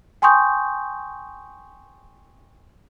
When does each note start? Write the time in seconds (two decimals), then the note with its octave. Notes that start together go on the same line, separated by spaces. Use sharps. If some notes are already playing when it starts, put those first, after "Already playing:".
0.22 G5 G#5 C6 C#6 D#6 G6